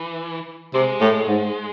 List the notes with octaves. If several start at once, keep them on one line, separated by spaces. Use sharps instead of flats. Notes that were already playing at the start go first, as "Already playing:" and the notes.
Already playing: E3
C3 G#3
A2
G#2